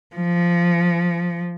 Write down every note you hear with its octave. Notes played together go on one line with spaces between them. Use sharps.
F3